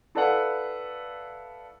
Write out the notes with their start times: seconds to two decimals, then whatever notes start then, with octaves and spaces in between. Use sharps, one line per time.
0.15 E4 A4 B4 D5 F5 F#5